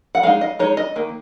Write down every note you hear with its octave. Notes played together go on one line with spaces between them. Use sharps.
F#5
G#3 D#4 F5
D#5
G#3 D#4 C#5
D#5
D#3 A#3